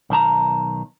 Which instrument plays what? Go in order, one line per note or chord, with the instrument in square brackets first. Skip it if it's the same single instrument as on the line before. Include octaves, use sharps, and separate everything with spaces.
[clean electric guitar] B1 D#3 A5 A#5